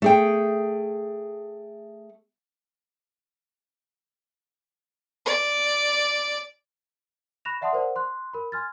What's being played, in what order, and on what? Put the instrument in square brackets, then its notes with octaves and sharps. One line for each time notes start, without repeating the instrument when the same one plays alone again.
[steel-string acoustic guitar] A3 G#4 G5
[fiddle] D5
[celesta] B5 C#6 F#6 A#6 E7 F7
D5 E5 F#5 A5 C6 D#6
A#4 C5 D5 F#5
C6 F#6
A#4 B5
G#5 C6 F6 G#6 A6